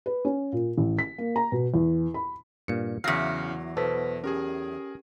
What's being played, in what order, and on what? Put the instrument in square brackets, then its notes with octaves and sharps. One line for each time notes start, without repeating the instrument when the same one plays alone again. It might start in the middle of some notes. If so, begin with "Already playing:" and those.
[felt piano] B4
C#4
A#2
A1
B6
A#3
A#5
B2
E2
B5
[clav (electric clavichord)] G2 A#2 [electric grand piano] C#7
[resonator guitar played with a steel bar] E2 F#3 [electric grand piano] C#3 A#6 C7 [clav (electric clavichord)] F5 [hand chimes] F6 C#7
[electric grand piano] B2 [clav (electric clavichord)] A4 [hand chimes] B4 C5 B6
[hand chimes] C#4 G4 [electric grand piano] G#4 A#4